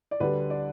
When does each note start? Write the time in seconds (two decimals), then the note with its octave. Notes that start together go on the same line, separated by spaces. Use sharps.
0.11 D5
0.20 D2 D3 G3 D4 B4
0.50 D5